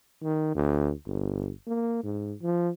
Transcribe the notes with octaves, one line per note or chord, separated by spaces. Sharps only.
D#3
D2
G1
A#3
G#2
F3